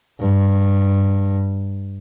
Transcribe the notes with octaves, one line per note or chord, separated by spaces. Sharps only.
G2